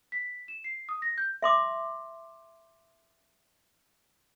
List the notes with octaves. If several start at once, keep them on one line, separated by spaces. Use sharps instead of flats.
B6
E7
C7
D#6
A#6
G6
E5 C6 D6